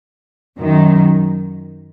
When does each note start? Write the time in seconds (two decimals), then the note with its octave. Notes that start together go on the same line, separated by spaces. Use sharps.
0.58 F#2 D#3 F#3